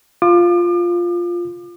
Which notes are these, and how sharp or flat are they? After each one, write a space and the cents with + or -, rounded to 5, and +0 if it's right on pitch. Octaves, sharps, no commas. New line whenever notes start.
F4 +0 D6 +40